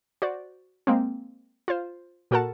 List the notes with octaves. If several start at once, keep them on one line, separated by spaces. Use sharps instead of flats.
F#4 C5 D5
G#3 A#3 C4
F4 C5
A#2 F#4 A4 A#4 F#5 A5